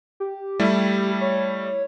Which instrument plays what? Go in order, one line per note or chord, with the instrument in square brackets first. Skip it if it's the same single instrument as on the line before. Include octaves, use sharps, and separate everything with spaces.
[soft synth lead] G4
[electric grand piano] G3 A3 E4
[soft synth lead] C#5